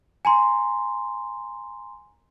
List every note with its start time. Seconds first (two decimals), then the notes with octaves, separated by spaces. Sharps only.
0.25 G#5 A#5 C6